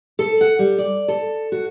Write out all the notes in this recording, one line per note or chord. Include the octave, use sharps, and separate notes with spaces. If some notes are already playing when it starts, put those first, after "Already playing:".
A4
F#5
G3
D5
A4
F#4